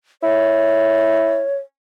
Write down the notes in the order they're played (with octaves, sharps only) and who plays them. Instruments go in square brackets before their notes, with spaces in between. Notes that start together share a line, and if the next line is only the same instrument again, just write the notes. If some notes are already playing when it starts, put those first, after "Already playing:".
[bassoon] E4 [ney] C#5